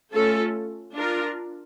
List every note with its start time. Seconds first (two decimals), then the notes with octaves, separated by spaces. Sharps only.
0.13 A3 C#4 F4 A4
0.94 D4 F4 A#4